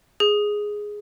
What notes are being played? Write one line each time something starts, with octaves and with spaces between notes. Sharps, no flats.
G#4